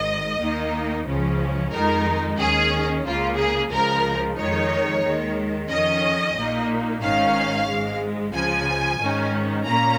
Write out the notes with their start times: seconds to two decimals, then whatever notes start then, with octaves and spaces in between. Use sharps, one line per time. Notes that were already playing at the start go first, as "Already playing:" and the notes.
Already playing: G#1 G#2 D#3 D#5
0.41 D#2 D#3 A#3 D#4
1.06 C#2 C#3 F3 C#4
1.72 F2 D#3 G#3 D#4 A#4
2.39 D#2 D#3 C#4 G#4
3.05 C#2 C#3 A#3 F4
3.37 G#4
3.70 C#2 C#3 F3 G#3 A#4
4.37 F2 D#3 G#3 D#4 C#5
5.03 D#2 D#3 G#3
5.70 F2 D#3 C#4 D#5
6.35 A#1 A#2 A#3 D#4
7.01 G#1 G#2 D#3 C#4 F5
7.68 G#1 G#2 G#3
8.33 C#2 C#3 F3 G#5
8.99 G#1 G#2 D#3 C#4
9.65 A#2 A#3 C#4 A#5